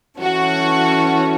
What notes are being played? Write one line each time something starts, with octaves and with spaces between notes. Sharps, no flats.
E3 C#4 F#4 A4 C#5